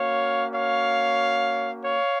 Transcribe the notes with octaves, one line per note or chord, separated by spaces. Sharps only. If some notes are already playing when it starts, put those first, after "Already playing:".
Already playing: A#3 C#4 F#4 C#5 F5
C#5 F5
C#5 F5